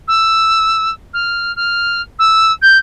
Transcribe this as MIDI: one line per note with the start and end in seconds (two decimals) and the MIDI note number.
0.08 0.91 88
1.13 1.54 89
1.56 2.01 89
2.19 2.52 88
2.62 2.78 91